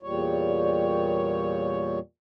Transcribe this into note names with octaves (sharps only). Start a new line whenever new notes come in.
E2 A#2 G3 C#5